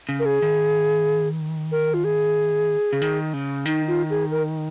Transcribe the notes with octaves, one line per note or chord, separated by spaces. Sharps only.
C#3
A#4
G#4
D#3
A#4
F4
G#4
C#3
D#3
C#3
D#3 D#4
F4
G#4
A#4